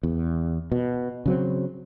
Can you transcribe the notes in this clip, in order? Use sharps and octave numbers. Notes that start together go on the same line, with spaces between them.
E2
B2
C#3 F#3 C4